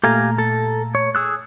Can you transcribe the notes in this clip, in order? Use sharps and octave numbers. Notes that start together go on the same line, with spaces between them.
A#2 A3 G4 F5 G#5 A#5
A4
C#5
G#4 E6 F#6